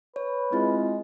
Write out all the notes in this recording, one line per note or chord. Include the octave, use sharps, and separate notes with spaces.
B4 C#5
G#3 C4 E4 F4